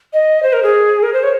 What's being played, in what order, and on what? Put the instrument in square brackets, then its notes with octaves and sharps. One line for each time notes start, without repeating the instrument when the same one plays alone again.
[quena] D#5
C5
A#4
G#4
A#4
C5
C#5